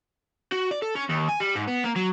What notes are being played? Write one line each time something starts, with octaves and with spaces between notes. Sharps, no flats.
F#4
D5
A4
C#4
D#2
G#5
G3
G#2
B3
A#3
F#3